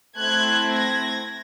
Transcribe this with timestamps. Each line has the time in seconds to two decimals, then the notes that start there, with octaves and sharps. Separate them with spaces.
0.17 A3 C4 E4 F#6 G#6
0.71 G#6 A#6